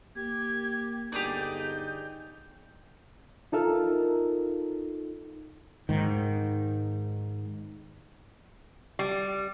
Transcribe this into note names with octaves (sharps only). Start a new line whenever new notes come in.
A#3 G4 G#6
G1 D3 D#4 G4 G#4 D5 G6
D#4 F4 A4 A#4 E5 F5
G#2 D#3
G3